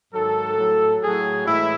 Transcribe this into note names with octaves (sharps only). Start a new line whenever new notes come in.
G#2 D#3 F#3 A4
A2 F#3
A2 F#3 G#4
A2 E3 G#3 E4